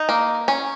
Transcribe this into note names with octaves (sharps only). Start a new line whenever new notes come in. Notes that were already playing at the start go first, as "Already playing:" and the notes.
Already playing: D#4
A#3
C#4